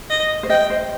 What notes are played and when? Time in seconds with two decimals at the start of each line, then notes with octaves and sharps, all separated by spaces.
0.10 D#5
0.43 C5
0.49 D#5 G5
0.70 C5